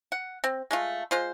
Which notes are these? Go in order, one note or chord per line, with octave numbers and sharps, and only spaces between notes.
F#5
C4
G#3 A3 F4
G#3 F4 C5